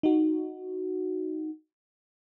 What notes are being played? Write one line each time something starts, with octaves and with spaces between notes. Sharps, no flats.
D#4 F#4